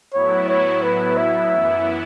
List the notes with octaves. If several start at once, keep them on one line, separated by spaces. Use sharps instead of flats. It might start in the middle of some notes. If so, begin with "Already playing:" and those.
A2 F#3 B3 E4 C#5
C#5
B4
E5
F#2 E3 B3 E4